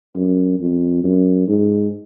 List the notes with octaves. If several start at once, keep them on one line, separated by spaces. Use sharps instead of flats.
F#2
F2
F#2
G#2